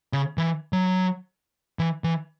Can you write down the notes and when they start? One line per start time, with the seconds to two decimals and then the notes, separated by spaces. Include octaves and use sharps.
0.13 C#3
0.38 E3
0.73 F#3
1.79 E3
2.04 E3